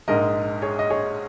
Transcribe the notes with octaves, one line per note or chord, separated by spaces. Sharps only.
A#1 G#2 G#3 D#4 A#4 D#5
G#4 C#5
D#5
G#4 C#5